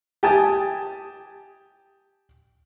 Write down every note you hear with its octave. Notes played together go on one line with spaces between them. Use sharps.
G4 G#5 A5 D#6